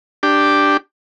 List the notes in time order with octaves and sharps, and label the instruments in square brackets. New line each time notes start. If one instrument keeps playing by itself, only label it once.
[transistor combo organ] D4 G4